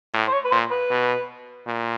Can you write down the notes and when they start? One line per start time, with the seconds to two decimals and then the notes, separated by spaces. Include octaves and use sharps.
0.14 A2
0.27 C5
0.32 C#5
0.44 B4
0.51 A#2 C5
0.71 B4
0.90 B2
1.66 A#2